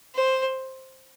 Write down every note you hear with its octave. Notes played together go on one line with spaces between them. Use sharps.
C5